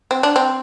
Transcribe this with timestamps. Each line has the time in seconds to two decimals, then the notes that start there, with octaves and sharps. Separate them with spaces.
0.11 C4
0.23 D4
0.36 C4